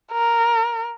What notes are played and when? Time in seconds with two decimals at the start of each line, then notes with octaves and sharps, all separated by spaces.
0.12 A#4